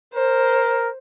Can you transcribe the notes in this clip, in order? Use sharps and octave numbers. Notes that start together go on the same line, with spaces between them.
A#4 C5